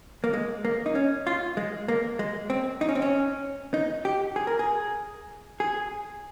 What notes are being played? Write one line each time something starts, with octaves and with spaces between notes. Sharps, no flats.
A#3
G#3
A#3
D#4
C#4
F4
G#3
A#3
G#3
C4
D#4
C#4
C4
C#4
D#4
G4
G#4
A#4
G#4
G#4